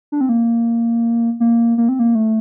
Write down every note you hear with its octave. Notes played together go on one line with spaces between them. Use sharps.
D4
C4
A#3
A#3
A#3
C4
A#3
A3